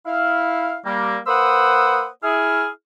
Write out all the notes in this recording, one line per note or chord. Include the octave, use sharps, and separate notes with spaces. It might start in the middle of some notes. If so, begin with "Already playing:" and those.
E4 F5
G3 A#3
A#3 B4 C5 F#5 D#6 E6
E4 G#4 F6